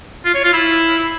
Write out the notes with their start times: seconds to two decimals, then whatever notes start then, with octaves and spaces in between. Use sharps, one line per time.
0.25 F4
0.34 C#5
0.44 F4
0.53 E4